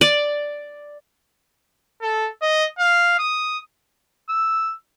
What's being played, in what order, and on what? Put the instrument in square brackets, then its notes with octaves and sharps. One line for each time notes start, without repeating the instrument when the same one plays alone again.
[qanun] D5
[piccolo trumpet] A4
D#5
F5
D#6
[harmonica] E6